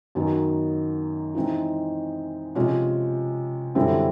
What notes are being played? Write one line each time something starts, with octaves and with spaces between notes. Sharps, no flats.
F#2 D#3 F#3 B3 D#4
E3 G#3 C4 D#4
C3 F3 G#3 C#4
F#2 D3 G3 C4 E4